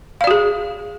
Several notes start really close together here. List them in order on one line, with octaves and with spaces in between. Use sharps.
F5 D5 F#4 G#4